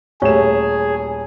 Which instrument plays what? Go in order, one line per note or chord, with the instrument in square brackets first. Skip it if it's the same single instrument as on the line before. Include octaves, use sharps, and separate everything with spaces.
[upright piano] D#1 A3 E7 [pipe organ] G#4 [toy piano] C#5 F5 C#6